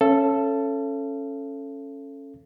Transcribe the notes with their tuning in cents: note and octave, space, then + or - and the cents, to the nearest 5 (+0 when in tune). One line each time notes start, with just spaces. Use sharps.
C#4 -10 A4 +0 F5 -45